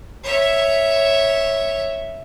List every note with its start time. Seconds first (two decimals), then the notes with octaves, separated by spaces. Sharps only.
0.24 C#5 E5